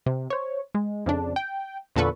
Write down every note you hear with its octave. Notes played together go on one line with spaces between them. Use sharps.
C3
C5 C#5
G#3
F2 C#3 D4
G5
E2 A#2 D3 A4 B4 C#6